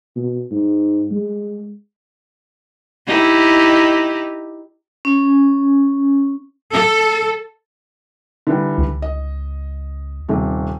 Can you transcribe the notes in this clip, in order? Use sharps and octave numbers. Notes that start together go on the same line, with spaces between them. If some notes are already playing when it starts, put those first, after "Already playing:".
B2
G#2
G#3
D#4 E4 G4
C#4
A4
D3 E3 G3
C#2
D#5
D#1 C3